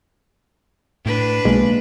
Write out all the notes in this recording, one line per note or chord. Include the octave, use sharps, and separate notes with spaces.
A2 D4 B4
B1 G#3 A#3